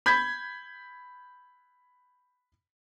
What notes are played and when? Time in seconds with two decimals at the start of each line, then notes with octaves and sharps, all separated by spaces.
0.06 B5 G6 G#6 B6